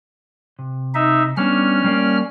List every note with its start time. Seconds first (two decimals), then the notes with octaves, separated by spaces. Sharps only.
0.59 C3
0.95 D#4 E5
1.37 G3 B3 C#4 D4 F6
1.84 G3 A#3 D5